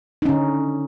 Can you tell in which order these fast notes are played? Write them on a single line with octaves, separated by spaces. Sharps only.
D#4 C#4 D3